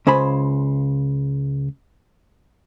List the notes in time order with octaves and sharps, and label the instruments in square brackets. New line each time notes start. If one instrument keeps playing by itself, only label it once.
[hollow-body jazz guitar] C#2 C#3 C5 G#5 B5